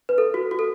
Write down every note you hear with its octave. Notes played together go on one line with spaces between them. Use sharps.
B4
A4
F#4
F#4
A4